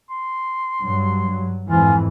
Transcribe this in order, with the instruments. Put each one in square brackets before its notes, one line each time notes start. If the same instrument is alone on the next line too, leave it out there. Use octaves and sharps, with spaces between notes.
[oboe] C6
[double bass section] G2 F#3
[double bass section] F2 G#2 E3 [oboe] F4 [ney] G#5